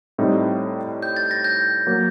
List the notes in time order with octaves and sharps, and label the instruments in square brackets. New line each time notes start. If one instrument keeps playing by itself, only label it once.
[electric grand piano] A2 G3 C4 D#4
[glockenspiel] G6
A6
A#6
G6
[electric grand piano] F#3 A#3